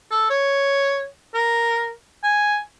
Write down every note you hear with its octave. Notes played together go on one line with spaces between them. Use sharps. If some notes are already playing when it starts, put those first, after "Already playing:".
A4
C#5
A#4
G#5